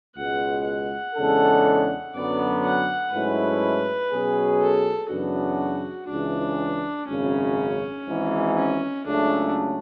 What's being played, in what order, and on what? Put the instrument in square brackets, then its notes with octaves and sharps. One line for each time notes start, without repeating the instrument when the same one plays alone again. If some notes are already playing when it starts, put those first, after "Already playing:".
[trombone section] C#2 B2 G#3 [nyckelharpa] F#5
[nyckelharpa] F#5
[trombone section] E2 C#3 G#3 D4 A4
[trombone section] F#2 D3 F#3 B3 [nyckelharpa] D5
[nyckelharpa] F#5
[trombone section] G#2 F#3 A3 C#4 E4 [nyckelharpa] B4
[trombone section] B2 F#3 C#4 G#4
[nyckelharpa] A4
[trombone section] F#2 C#3 E3 B3 D4 [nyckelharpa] F#4
[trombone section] C#2 C#3 E3 [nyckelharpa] D4
[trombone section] G#1 F#2 C#3 [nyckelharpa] C#4
[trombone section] G#1 G#2 E3
[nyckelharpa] C#4
[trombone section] C#2 C#3 F#3 A3 [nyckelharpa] D4